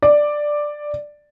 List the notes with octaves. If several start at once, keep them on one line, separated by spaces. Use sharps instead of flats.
D5